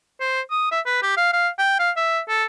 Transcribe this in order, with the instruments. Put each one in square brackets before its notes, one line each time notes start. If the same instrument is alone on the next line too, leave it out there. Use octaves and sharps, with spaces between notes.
[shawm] C5
D#6
E5
B4
G4
F5
F5
G5
F5
E5
A4